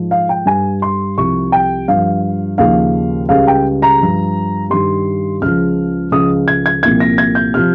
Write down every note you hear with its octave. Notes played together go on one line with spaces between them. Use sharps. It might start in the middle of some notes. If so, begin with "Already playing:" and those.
Already playing: G#2 F3
F5
G5
G2 G3 G#5
C6
C2 C3 F3 C#6
G5
G2 F3 F5
D#2 C#3 F3 F5
C#2 C#3 G3 F5
G5
A#5
G2 F3
G2 D#3 G3 C6
C#2 C#3 F3 F6
C#2 C#3 F3 D#6
G#6
G#6
C2 A#2 F3 G#6
A#6
G#6
G6
C3 F3 F6